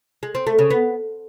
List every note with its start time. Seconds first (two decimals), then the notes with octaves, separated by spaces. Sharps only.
0.23 G#3
0.35 C4
0.47 A3
0.59 C#3
0.70 B3